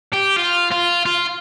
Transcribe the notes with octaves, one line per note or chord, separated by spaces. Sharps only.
G4
F4
F4
F4